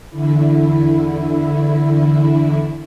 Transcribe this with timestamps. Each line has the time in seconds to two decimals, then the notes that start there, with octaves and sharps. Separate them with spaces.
0.10 E2 D3 E4